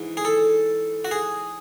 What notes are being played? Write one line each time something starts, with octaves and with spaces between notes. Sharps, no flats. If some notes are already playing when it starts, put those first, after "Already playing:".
Already playing: G#2 E3
G#4
A4
F#4
G#4